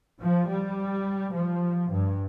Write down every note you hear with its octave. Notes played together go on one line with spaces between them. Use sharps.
F3
G3
F3
G2